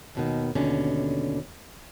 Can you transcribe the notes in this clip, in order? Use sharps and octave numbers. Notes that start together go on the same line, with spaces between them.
D#2 B2 D#3
D#2 B2 D3 C#4